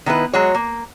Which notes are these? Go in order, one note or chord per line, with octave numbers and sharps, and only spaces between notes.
D#3 B3 E4 B4
F#3 G#3 F#4 C#5
A#3